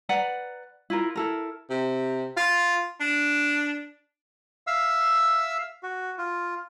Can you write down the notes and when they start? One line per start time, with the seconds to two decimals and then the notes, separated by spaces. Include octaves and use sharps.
0.09 B4 D5 F#5 A#5
0.90 E4 F4 A#4
1.16 E4 A4 A#4
1.70 C3
2.37 F4
3.00 D4
4.67 E5 F5 E6
5.83 F#4
6.18 F4